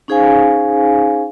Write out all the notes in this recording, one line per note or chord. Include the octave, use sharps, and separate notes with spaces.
C#4 D#4 G#4 C5 F5 G#5